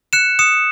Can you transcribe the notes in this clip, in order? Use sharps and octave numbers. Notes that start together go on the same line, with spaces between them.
F#6 C#7 E7
D#6 C#7 E7